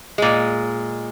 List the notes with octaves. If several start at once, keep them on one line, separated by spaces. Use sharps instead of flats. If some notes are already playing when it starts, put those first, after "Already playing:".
A#2 G#3